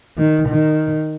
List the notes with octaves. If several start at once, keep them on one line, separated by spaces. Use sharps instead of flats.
D#3
D#3